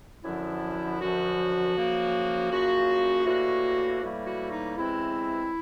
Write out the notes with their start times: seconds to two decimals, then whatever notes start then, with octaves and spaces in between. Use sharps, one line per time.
0.24 F#2 D3 F3 E4
1.00 F#2 D3 F3 F#4
1.76 F#2 C#3 F3 A#3
2.51 F#2 C#3 F3 A#3 F#4
3.26 A2 E3 G3 A#3 F#4
4.02 A2 E3 G3 A#3
4.26 F#4
4.52 D#4
4.77 E2 C3 E3 G#3 C4 E4